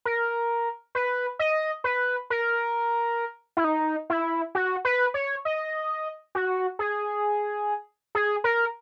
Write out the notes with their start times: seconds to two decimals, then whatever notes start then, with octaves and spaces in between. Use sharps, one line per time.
0.05 A#4
0.95 B4
1.39 D#5
1.84 B4
2.30 A#4
3.57 E4
3.64 D#4
4.10 E4
4.55 F#4
4.85 B4
5.14 C#5
5.45 D#5
6.35 F#4
6.79 G#4
8.15 G#4
8.44 A#4